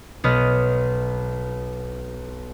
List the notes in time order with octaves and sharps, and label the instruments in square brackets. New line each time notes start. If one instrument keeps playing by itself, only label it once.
[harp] B1 B3 B4 D#5 F6